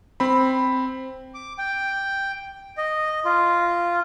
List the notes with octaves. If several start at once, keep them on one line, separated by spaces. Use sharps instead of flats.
C4 B5
D6
G5
D#5
F4